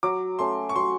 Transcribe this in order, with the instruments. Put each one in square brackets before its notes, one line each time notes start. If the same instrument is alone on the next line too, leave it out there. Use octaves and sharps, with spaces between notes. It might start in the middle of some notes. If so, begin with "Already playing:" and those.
[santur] F#3 [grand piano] D6
[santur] A3 C#4 [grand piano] C6
[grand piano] C#6
[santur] F#3 [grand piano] C6